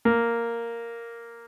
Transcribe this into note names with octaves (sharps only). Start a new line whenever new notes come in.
A#3